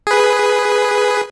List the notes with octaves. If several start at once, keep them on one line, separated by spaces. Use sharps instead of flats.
G#4 B4